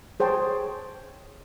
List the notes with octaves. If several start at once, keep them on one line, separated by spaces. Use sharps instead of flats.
G#4 C5 C#5 G5 A5